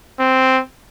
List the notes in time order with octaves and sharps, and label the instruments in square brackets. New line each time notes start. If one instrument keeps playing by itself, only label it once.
[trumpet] C4